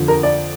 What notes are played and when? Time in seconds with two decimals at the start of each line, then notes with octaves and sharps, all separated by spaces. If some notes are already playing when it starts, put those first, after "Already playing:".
Already playing: F2 D3 F3
0.08 A#4
0.23 D5